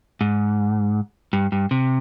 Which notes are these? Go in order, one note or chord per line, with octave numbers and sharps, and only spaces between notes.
G#2
G2
G2
C3